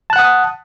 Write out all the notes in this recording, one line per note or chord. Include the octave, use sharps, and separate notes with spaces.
F#5 A5 D#6 F#6